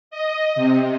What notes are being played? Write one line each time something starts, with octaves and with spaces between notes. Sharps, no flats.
D#5
C3